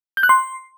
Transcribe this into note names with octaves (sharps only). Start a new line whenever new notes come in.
G6
F#6
C6